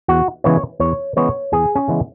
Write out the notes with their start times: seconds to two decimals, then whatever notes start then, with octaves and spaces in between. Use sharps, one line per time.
0.08 E2 F#4
0.44 C#3 E3 G#3 B3 C#5
0.80 E2 C#5
1.16 C#3 E3 G#3 B3 C#5
1.52 E2 G#4
1.75 C#4
1.88 C#3 E3 G#3 B3